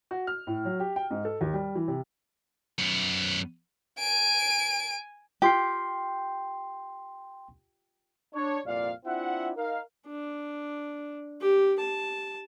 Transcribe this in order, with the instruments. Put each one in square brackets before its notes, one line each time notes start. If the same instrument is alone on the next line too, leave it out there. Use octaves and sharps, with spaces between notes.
[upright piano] F#4
F6
A2
F#3
G4
G5
G#2
A4
D#2
G3
E3
C3
[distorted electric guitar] F#2 B3
[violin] G#5 D7
[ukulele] F4 G4 [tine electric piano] G5 C6 C7
[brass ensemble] D4 C#5
C2 F2 A#2 D5 F5
C4 D4 E4 F4 E5 F#5
D#4 A#4 F5
[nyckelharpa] D4
G4
A5